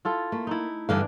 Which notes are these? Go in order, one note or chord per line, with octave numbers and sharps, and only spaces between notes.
E4 F4 A4
A3 A#3
D#4 E4
G2 D3 E3 D4 F5